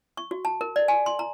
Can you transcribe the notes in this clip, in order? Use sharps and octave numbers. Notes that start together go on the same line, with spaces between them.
C#6
F#4
A5
A#4
D5
G#5
C6
A#5